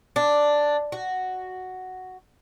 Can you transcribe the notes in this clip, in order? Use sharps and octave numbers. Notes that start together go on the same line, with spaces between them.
D4
F#4